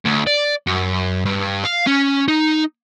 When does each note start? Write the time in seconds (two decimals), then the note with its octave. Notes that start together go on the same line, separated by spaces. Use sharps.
0.05 D2
0.27 D5
0.67 F#2
1.26 G2
1.65 F5
1.87 C#4
2.28 D#4